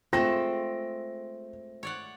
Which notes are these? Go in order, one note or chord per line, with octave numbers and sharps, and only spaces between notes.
G#3 A3 C4 F4 A4 A#6
C#5 D5 F#5